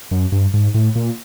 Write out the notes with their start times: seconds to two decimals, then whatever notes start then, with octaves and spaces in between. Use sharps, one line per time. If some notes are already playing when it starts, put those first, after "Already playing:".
0.11 F#2
0.32 G2
0.54 G#2
0.74 A2
0.95 A#2